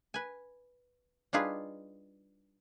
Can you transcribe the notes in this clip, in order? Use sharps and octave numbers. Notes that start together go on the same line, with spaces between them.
B4 G#5
G3 D4 D#4 F4 G#4 B4